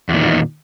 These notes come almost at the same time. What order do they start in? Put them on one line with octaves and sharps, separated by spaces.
E2 A#2 D#3